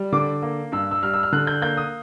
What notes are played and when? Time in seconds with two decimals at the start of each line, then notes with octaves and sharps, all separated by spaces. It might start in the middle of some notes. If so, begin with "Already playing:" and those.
Already playing: G3
0.12 D3 D6
0.42 A#3
0.72 G2 E6
0.91 E6
1.02 G3 F6
1.14 E6
1.23 F6
1.32 D3 F#6
1.47 G6
1.62 A#3 G6
1.77 D#6